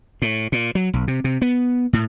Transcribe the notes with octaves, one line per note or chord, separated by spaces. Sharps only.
A2
A#2
F#3
B1
C3
C3
B3
A2